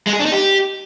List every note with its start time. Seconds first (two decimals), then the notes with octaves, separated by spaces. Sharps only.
0.07 G#3
0.13 G#4
0.19 D4
0.26 D#4
0.32 G4